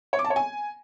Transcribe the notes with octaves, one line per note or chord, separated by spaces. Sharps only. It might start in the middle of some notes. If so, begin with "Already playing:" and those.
C#5
D6
A5
C#5
G#5